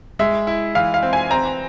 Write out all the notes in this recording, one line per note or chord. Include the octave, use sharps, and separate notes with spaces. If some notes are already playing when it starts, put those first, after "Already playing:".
G#3 E5
E4
E3 F5
F5
C4
G#5
C4 A#5